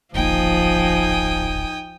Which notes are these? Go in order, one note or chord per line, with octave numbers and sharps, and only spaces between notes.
D1 G#1 F3 A#3 D#4 G5 G#5 D#6